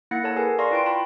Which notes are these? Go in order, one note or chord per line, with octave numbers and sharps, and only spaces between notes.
A#3 E4 F#5 F#6 A#6 C#7
A4 C#5 A5
G#4 A#4 B4 G#5
D5 F5 A#5 C6 C#6 A#6
E4 F4 B4 G5 C6 D7
G5 A5 B5